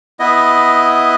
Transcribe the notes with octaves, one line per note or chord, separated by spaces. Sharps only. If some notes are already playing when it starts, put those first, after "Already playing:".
B3 E4 D#5